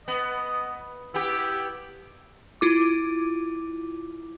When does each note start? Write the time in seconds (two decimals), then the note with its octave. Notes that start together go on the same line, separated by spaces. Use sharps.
0.08 B3 D#5
1.14 B3 E4 G4
2.61 E4 F4 D6